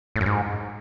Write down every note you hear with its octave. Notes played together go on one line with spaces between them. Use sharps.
A2
F#2
G#2